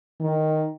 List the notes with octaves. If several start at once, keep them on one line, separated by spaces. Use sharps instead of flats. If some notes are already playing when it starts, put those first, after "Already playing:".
D#3